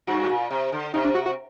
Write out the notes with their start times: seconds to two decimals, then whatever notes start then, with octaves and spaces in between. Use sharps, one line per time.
0.07 G2 F#4
0.24 A2
0.29 A#2
0.51 C3
0.72 D3
0.94 C3 D#4
1.04 D4
1.14 F#4
1.26 F#4